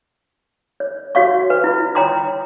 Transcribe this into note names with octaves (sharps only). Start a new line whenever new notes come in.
C#5
F#4 C#5 F5 C#6
B4
E4 F4 B4
C#5 G5 A#5 C6 D#6